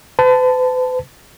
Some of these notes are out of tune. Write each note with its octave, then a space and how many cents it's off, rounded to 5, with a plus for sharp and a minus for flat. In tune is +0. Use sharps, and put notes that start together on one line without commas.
B4 +45 A5 +0